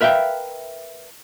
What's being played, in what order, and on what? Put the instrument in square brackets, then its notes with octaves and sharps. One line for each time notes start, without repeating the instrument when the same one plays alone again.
[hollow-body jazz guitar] A#4 B4 E5 F5 G5